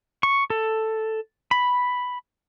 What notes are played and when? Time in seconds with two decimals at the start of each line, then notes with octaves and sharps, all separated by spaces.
0.23 C#6
0.50 A4
1.51 B5